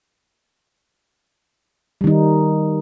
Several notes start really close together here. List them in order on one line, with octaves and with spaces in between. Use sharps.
G3 D#3 D#4